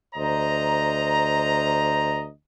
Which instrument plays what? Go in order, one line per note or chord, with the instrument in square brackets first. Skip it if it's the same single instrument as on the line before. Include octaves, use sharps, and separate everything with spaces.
[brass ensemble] D2 C5 D#5 A#5